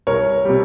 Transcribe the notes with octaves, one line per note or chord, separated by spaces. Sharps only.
C2 A#4 C#5
C3 G3